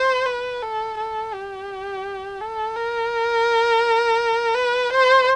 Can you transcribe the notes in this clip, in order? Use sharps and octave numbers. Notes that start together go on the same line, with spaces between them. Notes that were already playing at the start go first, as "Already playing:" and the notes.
Already playing: C5
B4
A4
A4
G4
A4
A#4
B4
C5